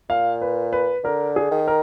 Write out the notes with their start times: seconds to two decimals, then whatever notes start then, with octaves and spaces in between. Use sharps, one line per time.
0.10 A#2 F5
0.42 B4
0.73 B4
1.04 D3 A#4
1.36 G#4
1.51 D#3
1.67 A#4